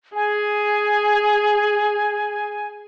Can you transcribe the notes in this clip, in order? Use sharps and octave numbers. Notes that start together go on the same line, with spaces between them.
G#4 G#5